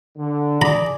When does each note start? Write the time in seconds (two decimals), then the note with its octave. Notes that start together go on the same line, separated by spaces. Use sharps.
0.18 D3
0.62 G#4 D5 A#5 B5